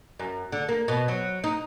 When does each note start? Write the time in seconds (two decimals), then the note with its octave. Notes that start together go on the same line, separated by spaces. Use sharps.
0.19 F#2
0.52 D3
0.69 A#3
0.88 B2
1.08 F#3
1.44 D#4